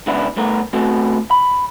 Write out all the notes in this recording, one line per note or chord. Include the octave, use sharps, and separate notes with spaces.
C#3 G#3 B3 D4 E4
G2 A3 B3 A#4
A3 B3 C4 F#4 A4
B5